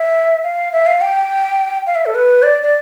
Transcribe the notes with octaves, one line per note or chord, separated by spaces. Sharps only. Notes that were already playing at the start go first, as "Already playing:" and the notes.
Already playing: E5
F5
E5
F5
G5
F5
E5
A4
B4
D5
D5